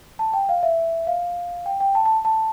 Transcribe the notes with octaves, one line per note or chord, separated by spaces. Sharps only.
A5
G5
F5
E5
F5
G5
G5
A5
A5
A5